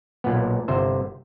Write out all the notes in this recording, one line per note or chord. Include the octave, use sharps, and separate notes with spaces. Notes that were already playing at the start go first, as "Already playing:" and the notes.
B1 A#2 B3
G1 C3 C5 E5